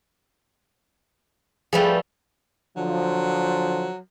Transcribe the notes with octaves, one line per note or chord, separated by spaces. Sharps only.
F3 G3 A3 G#4 B4 G5
D3 F3 F#3